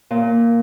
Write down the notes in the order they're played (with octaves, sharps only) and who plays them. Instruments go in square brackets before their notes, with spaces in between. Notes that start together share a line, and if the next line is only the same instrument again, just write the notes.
[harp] A#2